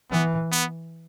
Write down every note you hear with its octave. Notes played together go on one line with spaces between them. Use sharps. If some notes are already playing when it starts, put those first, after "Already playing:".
E3 B3
B3